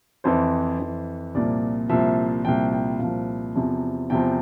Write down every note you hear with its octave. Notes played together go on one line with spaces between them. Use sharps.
F2 E3 C5
F2 E3
C2 A#2 F3 D5
C2 A#2 F3 E5
C2 A#2 F3 G5
G5
C2 A#2 F3 F5
E2 C3 F3
E2 C3 F3 G5